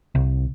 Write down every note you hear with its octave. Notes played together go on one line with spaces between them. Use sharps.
C2